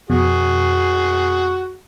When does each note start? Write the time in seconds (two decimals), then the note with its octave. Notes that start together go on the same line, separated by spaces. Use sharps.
0.10 F2 B2 F#4 G#4